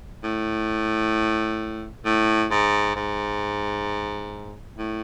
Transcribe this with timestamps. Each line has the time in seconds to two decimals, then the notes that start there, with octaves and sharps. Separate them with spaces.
0.23 A2
2.05 A2
2.51 G#2
2.96 G#2
4.78 A2